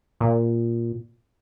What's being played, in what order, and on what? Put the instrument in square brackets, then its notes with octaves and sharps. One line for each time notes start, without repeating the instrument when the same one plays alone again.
[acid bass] A#2